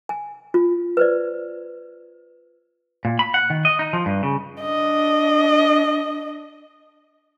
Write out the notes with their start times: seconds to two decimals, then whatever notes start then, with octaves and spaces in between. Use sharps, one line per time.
0.09 G#5
0.54 F4
0.97 B4 C5 D5
3.05 A#2
3.19 B5
3.34 F#5
3.50 D#3
3.65 D#5
3.79 D#4
3.93 F3
4.06 G2
4.23 C#3
4.62 D4 D#5